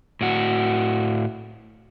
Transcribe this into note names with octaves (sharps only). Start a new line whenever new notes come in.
A2 F#4